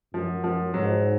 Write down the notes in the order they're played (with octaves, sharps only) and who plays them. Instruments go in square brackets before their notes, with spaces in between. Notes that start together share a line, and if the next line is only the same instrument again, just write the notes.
[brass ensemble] F#2 [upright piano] F3
[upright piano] F3
[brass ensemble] G#2 [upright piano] F#3